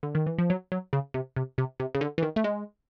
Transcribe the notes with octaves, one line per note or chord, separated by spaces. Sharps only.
D3
D#3
E3
F3
F#3
F#3
C#3
C3
C3
C3
C3
C#3
D3
E3
D#3
A3
G#3